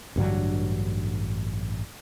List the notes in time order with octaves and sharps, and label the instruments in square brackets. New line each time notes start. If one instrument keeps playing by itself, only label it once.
[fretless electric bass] A1 G2 D3 F#3